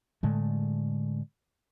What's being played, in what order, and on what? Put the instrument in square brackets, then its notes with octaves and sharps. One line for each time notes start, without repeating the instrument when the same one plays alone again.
[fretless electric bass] A2 D3 G#3 A3